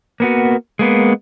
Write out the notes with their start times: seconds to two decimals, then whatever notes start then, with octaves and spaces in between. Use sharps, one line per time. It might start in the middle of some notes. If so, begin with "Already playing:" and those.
0.20 A#3 B3 F#4
0.79 G#3 A#3 B3